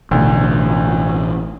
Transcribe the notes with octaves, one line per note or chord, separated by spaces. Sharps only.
A1 D2 B2 D4